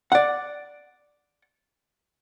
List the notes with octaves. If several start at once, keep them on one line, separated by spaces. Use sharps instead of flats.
D5 F#5